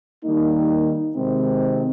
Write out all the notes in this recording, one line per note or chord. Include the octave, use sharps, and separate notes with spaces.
D#3 G3 A#3 D#4
C3 D#3 G#3 C4